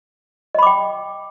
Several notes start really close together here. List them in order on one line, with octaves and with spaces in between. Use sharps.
D#5 B5 D6 G5